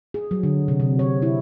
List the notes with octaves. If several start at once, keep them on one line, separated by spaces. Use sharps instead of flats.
G#4
F#3
D3
C3
C3
C#5
E4